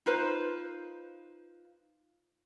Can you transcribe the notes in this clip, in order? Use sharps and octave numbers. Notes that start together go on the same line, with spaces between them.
D#4 F4 B4 C5